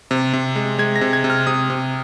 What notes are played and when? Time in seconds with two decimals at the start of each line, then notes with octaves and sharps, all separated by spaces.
0.11 C3
0.33 C3
0.56 G#3
0.79 G#3 G#6
0.96 A#6
1.01 C3
1.13 G#6
1.24 C3
1.30 F6
1.47 C3 D#6
1.70 C3